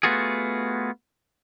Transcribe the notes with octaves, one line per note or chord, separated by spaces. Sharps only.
A3 B3 F4 F#4 G#4